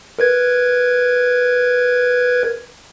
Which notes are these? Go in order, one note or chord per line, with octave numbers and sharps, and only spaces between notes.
A#4 B4 G#6